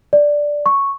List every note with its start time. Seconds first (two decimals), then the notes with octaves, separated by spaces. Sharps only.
0.13 D5
0.66 C#6